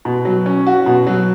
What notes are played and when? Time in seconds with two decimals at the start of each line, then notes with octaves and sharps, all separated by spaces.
0.05 B2
0.25 F#3
0.46 C#4
0.67 F#4
0.86 B2
1.07 F#3